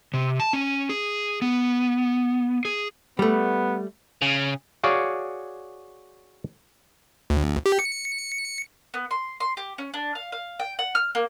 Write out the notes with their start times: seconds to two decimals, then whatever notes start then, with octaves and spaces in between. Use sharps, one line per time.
0.14 C3
0.40 A5
0.53 C#4
0.89 G#4
1.42 B3
2.65 G#4
3.19 G3 A3 B3
4.22 C#3
4.84 F#4 G#4 C#5 D5 F5
7.30 D2
7.66 G4
7.79 C#7
8.94 B3
9.11 C6
9.40 C6
9.57 G4
9.78 C#4
9.94 D4
10.15 F5
10.32 F5
10.60 G5
10.79 F#5
10.95 F6
11.15 A#3